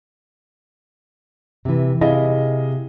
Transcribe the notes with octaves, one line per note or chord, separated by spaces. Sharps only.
C3 E3
C3 E4 G#4 D#5 F5